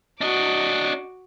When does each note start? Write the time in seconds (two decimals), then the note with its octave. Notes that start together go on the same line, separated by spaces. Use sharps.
0.21 D4 F#4 D#5 D6